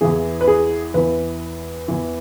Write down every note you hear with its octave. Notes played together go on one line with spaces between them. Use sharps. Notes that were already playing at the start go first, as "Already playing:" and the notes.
E2 E3 G#4
B4
G#4
E2 E3 B4
E2 E3